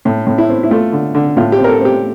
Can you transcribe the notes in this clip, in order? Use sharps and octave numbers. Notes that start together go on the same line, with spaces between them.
A2
A2
E4
C4
E4
A3 F4
D3
D3
A2 F4
G4
C4
A#4
A4
C4 G4